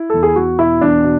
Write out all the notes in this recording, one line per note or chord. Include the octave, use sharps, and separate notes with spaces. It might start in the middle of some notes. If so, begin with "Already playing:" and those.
Already playing: E4
E2 A4
G#4
E2 F#4
B2 E4
E2 D4
B2